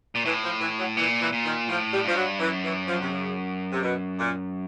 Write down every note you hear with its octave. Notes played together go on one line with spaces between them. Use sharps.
A#2
A2 E3
F3
E3
F#3
A#2 E3
E3
A#2
D#3
A2 F3
G3
G2 F3
F#3
F#2 E3
E3
F3
C3
C#3
C3
B2
A#2